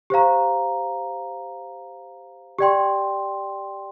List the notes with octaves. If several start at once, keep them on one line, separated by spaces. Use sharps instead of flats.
G4 C5 F5 A#5
G4 D5 G5 C6